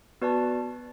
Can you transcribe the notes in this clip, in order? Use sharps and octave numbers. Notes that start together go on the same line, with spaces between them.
B3 F#4 B4 D5 A5